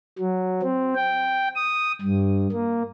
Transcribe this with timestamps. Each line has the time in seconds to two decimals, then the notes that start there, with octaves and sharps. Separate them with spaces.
0.19 F#3
0.62 C4
0.96 G5
1.56 D#6
2.01 G2
2.52 A#3